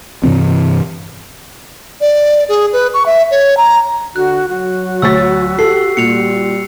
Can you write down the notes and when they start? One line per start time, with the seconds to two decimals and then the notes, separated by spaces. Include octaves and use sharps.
0.23 G2 C3 E3 C4
2.01 D5
2.49 G#4
2.73 B4
2.94 C#6
3.06 E5
3.31 C#5
3.57 A#5
4.16 D3 F#4 F#6
4.49 F#3 F#4
5.02 D2 C#5 E6 A6 B6
5.59 G4 A4 C7
5.97 A#2 G3 C#7 F7